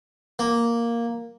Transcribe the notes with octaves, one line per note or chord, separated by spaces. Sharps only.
A#3